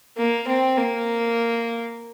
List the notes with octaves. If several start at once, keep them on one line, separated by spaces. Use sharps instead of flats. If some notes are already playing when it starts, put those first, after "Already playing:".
A#3
C4
A#3